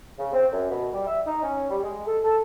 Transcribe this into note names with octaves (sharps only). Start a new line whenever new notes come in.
C#3
C4
F#2
B2
G3
E5
D#4
C#4
G3
G#3
A4
A4